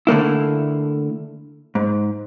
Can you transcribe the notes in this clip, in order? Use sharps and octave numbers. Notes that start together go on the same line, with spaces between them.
D3 A3 A#3 E4
G#2